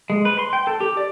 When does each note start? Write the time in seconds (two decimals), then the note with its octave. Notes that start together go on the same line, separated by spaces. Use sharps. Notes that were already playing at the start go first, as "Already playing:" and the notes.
0.10 G#3
0.25 B4
0.39 C6
0.53 G5
0.67 A4
0.80 G4
0.97 D5